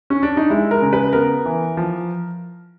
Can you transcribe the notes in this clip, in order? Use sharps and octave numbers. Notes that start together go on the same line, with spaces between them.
C#4
D4
D#4
G#3 E4
A#4
C#3
B4
B3 A#4
E3
F3